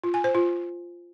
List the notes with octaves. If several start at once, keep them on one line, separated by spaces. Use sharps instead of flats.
F4
G#5
C5
F4